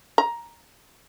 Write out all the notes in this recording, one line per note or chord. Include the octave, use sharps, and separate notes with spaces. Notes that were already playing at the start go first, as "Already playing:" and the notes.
A#5